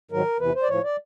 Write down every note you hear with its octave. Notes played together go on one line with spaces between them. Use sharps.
G#2 D#3 F#3 A#4
E2 C3 E3 B4
C5
D5
A2 F3 C#5
D5